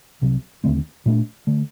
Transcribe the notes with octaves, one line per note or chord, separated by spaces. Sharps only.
C2 C3 F#3
D#2 D3 A3 C4
A#2 A3 D4
D3 A3